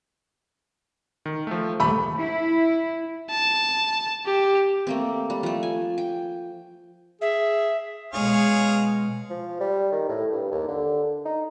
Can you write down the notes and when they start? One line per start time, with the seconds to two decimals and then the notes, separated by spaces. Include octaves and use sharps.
1.26 D#3
1.47 F3 A3
1.80 D#1 A3 B5
2.19 E4
3.30 A5
4.26 G4
4.87 A3 A#3 C4
5.30 G3
5.43 F3 A3
5.63 G#5
5.98 G5
7.21 G#4 E5
8.13 B2 G#3 G#4 C#5 F5
9.30 F3
9.60 G3
9.92 D#3
10.09 A2
10.32 G2
10.52 D#2
10.68 D3
11.25 D#4